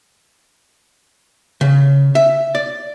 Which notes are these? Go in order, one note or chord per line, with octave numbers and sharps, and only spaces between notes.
C#3
E5
D5